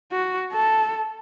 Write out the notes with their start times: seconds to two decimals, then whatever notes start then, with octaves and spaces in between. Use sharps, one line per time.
0.12 F#4
0.53 A4